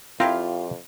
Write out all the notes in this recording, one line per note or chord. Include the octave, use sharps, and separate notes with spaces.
F2 C4 E4 F4 G4 A#4 C5 F5